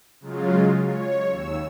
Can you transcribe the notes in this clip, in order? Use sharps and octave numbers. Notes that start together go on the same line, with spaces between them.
C#3 F#3 G#3 F4
C#5
D#2 E6